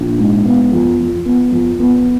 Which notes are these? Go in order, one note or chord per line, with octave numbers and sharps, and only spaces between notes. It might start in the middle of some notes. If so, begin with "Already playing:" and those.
Already playing: A#1
G#2
B3
F2
F3
B3
F2
B3